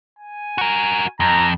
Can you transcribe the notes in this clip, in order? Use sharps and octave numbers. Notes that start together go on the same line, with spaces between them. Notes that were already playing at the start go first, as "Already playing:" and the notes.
G#5
F#4 A#4
F2 A#5